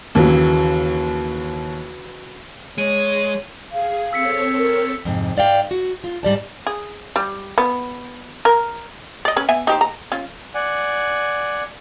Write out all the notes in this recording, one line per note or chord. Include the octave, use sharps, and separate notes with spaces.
D#2 C#3 E3 F#3
G#3 C#5 D#7
G#4 F5
C4 A4 C#5 E6 B6 C#7
A#4
F2 G#2 C3
G#2 D5 F5 G5
F#4
F4
G#2 G3 D5 A5
G#4
G3
B3
A#4
D5 D#5
C#4 B4
B3 E5 G#5
D#4 G4 C5
A#5
C#4 F4
D5 F#5 G#5